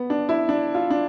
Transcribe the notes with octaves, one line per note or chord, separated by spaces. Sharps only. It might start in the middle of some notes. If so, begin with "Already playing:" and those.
Already playing: B3
D4
E4
D4
F4
D4